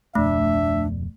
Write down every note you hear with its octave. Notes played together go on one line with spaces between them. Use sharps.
D1 F2 B2 A3 D4 E5